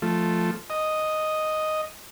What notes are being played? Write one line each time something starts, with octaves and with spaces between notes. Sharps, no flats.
F3 A3
D#5